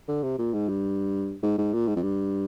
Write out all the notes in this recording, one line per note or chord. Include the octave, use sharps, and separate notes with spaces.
D3
C3
A#2
G#2
G2
G#2
G#2
A#2
G#2
F2
G2